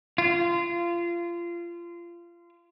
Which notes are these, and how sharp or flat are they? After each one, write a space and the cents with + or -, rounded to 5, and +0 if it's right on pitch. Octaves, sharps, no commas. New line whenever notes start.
F4 -25